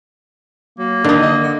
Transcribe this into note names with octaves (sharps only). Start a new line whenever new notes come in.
F#3 A#3
D3 D#3 D#4
D#5
D3